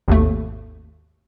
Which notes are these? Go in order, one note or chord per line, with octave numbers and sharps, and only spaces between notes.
G#1 D#2 A3